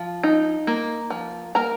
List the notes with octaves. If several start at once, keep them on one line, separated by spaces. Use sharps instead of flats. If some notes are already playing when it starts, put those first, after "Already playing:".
Already playing: F3
D#4
A#3
F3
A#3 A#4 A#5